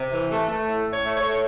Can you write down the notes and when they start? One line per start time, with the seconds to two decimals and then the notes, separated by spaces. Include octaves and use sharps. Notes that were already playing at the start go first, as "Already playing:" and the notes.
Already playing: C3
0.12 E3
0.31 A3
0.49 A3
0.67 A2
0.86 A2
0.92 C#5
1.04 A3
1.16 C#5
1.22 A3